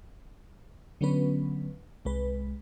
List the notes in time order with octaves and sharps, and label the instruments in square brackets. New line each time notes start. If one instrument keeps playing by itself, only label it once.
[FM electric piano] D3 F#3 B3 C#4 B4
C2 G#3 B4